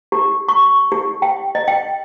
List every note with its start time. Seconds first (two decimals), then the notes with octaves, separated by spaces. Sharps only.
0.12 G4
0.48 C#6
0.92 G4
1.22 G5
1.55 D#5
1.68 G5